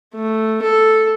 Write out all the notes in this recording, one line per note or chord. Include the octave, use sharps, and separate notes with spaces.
A3
A4